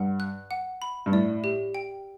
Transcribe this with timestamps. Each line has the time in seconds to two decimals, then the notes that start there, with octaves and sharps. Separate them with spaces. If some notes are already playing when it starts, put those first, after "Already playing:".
Already playing: G2 F#5
0.20 F#6
0.51 F#5
0.82 B5
1.06 G2
1.12 A2 D5
1.44 G4
1.74 G5